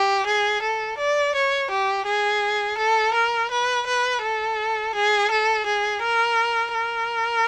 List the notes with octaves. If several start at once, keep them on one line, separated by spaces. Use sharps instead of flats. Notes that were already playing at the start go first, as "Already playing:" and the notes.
Already playing: G4
G#4
A4
D5
C#5
G4
G#4
A4
A#4
B4
B4
A4
G#4
A4
G#4
A#4
A#4